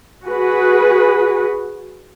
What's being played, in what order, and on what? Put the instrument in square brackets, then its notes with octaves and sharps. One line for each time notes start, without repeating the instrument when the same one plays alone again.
[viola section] F#4 G#4 B4